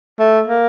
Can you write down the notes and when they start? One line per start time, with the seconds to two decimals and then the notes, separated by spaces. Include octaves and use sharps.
0.20 A3
0.48 A#3